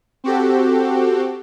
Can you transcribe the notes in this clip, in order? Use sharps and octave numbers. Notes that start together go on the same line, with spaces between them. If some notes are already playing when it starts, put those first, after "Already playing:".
C4 F#4 G4 A4